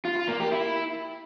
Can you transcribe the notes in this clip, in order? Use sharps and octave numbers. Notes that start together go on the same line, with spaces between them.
F4
F4
A#3
G4
E4